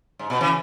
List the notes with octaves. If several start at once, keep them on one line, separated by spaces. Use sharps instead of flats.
G#2
B2
C#3 E3